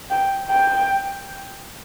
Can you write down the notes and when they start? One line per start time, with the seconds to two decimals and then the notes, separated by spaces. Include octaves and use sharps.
0.11 G5
0.50 G5